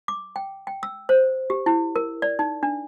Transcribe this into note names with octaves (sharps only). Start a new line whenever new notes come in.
D6
G5
G5
E6
C5
G4
E4
A#4
D5
D#4
D4